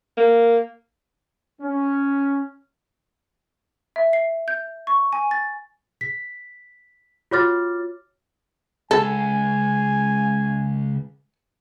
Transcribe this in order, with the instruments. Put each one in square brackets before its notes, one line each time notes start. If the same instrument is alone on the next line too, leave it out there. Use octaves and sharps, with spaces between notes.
[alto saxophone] A#3
[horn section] C#4
[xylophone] E5
C7
G6
C#6
G#5
A6
[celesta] B6
F4 F#4 C#5 D6 F6 A6
[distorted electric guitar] C#2 [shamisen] A4 [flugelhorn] G#5